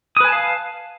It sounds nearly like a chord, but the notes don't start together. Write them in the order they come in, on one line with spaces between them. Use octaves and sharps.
D#6 B4 G#5 A5 F5